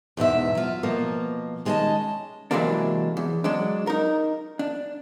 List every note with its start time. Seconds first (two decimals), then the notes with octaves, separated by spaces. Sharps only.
0.17 E2 G#2 B2 E5
0.55 F#3 F4
0.83 B2 F3 A#3
1.65 D#3 G#3 C#4 D5 D#5 A5
2.51 C3 E3 F#3 G#3 A#3 D4
3.17 E2
3.44 F#3 G#3 D4
3.87 D#4 A#4
4.59 D4